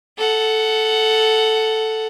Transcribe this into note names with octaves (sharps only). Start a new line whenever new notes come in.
A4 F#5